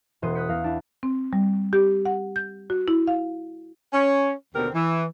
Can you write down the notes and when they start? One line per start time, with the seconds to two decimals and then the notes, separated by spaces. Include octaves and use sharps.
0.22 E1 B3 C#4 C5 D#6 D#7
0.35 D#6 F#6 G6 B6 C#7
0.49 E2 F5 A#6
0.64 D4 E4
1.03 C4
1.33 G3
1.73 G4
2.05 F#5
2.36 G6
2.70 F#4
2.88 E4
3.07 F5
3.93 C#4
4.55 D#2 B2 D3 C4 G4 A#4
4.74 E3